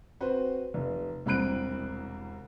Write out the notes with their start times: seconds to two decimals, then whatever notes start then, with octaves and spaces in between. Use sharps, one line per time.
0.21 C4 F#4 B4 C5
0.74 F1
1.26 E1 C2 C4 B5 F#6 D7